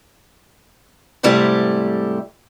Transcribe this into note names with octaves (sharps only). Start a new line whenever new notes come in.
G#2 C3 G3 A3 E4 G4